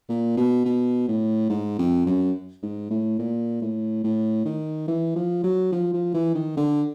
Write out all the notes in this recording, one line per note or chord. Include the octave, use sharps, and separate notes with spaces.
A#2
B2
B2
A2
G#2
F2
F#2
G#2
A2
A#2
A2
A2
D#3
E3
F3
F#3
F3
F3
E3
D#3
D3